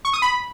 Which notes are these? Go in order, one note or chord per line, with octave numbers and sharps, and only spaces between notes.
C#6
D#6
B5